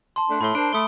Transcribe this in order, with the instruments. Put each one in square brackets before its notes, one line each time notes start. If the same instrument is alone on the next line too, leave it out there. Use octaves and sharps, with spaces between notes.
[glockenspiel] A5 C6
[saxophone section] A3 D4
[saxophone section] A2 [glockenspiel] B5 G7
[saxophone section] D4 A#4 C5 [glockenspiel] D7
[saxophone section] A3 [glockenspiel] B5 D#6 G7